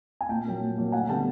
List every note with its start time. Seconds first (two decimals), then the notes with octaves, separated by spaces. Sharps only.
0.21 G#5
0.29 A#2 G5 A5
0.46 F#3 A#3
0.61 A#2
0.78 F#3 A#3
0.92 D2 F#5 G#5
1.09 D3 G3 B3 G5 A5